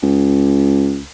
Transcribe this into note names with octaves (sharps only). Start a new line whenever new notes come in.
C#2